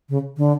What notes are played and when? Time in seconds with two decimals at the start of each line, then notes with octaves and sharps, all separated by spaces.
0.09 C#3
0.37 D3